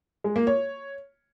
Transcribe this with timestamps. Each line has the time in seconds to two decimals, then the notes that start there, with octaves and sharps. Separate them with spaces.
0.24 G#3
0.36 A#3
0.47 C#5